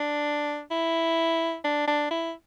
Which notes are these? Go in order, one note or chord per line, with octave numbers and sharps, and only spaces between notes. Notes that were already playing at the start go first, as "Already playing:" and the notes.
Already playing: D4
E4
D4
D4
E4